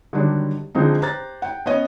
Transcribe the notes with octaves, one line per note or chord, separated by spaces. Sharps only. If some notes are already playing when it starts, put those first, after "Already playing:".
D3 D#3 F#3 G3 D4
D3 F3 G#3 C4 D#4
G4 C5 A#5 F#6 A6
F#5 G5
B3 C#4 C#5 D#5